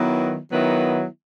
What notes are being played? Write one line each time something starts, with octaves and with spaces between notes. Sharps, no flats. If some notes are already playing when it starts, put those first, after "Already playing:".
Already playing: D#3 F#3 B3 E4
D#3 F#3 B3 E4